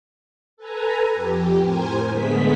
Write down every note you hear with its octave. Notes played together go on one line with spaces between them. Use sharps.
A4 B4 G#5 A#5
F2 G4
A2 A#4 C5 G#5
D3 G#3 A3 B3 G#4 B6